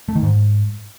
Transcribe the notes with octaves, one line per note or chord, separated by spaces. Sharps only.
A3
D#3
G#2